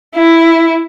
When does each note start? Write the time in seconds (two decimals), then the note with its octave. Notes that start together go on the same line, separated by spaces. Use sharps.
0.16 E4